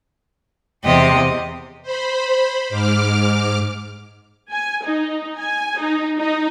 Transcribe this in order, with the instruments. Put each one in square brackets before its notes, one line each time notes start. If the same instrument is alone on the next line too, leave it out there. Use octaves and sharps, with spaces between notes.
[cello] E2 C3 [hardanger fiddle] G4 D#5
[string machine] C5 B5
G#2 D6 F6
[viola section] G#5
D#4
G#5
D#4
D#4